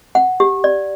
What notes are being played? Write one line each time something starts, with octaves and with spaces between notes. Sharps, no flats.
F#5
G4
D5